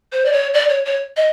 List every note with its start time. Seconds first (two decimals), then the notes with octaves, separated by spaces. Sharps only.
0.12 C5
0.25 D5
0.33 C#5
0.54 D5
0.69 C#5
0.85 C#5
1.17 D#5